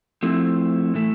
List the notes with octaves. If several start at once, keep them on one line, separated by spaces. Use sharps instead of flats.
F3 A3 C4 E4
A2 E3 A3